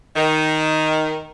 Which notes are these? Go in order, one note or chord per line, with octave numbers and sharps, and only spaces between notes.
D#3